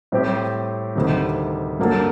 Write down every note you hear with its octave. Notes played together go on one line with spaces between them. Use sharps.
A2 G3 C4 G4
D2 C3 D#3 G3
G2 F#3 A#3 D4 A4